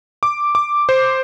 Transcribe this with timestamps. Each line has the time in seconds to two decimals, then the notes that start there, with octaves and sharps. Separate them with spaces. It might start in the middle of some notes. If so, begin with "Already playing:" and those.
0.23 D6
0.55 D6
0.89 C5